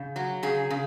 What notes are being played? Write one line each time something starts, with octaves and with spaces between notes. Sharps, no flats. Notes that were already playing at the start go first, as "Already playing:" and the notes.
Already playing: C#3
F#3
C#3 G#4
C#3